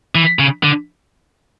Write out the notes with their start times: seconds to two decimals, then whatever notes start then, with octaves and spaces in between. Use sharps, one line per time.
0.15 E3
0.39 C#3
0.63 D3